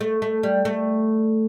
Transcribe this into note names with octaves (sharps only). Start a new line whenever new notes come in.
A3
A3
G3
A3